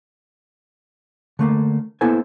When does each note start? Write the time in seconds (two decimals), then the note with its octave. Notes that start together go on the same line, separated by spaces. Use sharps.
1.39 D3 A3 A#3
2.01 A#3 B3 E4 A4 C5 G#5